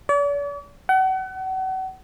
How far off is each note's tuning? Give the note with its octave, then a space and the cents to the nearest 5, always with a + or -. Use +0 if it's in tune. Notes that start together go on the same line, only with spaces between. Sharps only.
D5 -45
F#5 +35